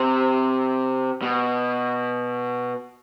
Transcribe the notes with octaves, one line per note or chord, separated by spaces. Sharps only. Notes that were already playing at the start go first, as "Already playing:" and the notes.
Already playing: C3
B2